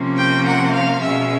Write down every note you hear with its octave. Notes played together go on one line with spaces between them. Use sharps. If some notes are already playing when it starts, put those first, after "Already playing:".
Already playing: C3 F3 A#3 C#4
G5
F#5
F5
B2 G#3 C#4 E5